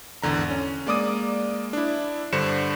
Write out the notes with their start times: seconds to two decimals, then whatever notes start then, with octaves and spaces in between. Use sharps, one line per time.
0.22 G#1 E2 D3 A#5
0.50 C#4
0.86 G#3 A#3 D5 D6 D#6 D#7
1.73 D4 E4
2.33 G2 D3 C5 C#7 E7